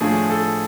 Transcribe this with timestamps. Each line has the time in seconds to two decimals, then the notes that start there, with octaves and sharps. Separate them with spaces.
0.01 A2 F3 A3 D4 G#4
0.30 A4